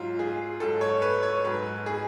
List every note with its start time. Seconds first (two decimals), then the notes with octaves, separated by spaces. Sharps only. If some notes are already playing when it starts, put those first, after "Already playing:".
Already playing: G#2 F#3 F4
0.19 G#4
0.60 G#2 F#3 A4
0.81 C#5
1.02 B4
1.23 C#5
1.44 G#2 F#3 B4
1.86 G#4